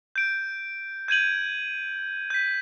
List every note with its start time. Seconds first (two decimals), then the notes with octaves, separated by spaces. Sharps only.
0.16 G6 D7
1.08 G6 G#6 D#7 F#7
2.30 G6 B6